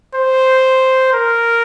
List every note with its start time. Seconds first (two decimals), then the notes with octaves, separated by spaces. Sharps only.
0.15 C5
1.13 A#4